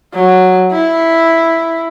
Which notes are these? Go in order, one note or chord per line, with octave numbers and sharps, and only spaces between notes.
F#3
E4